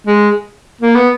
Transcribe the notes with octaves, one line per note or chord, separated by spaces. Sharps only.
G#3
A#3
B3